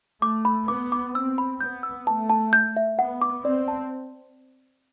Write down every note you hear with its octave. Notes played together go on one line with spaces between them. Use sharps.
A3 D6
B5
B3 D6
D6
C4 E6
B5
B3 G6
E6
A3 A5
A5
G6
E5
B3 F#5
D6
C4 D5
A5